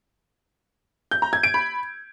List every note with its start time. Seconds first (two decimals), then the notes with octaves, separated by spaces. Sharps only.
1.11 G6
1.22 A#5
1.33 G#6
1.43 D7
1.54 B5